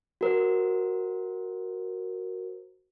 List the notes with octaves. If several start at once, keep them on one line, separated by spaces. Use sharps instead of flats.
F#4 A#4 C5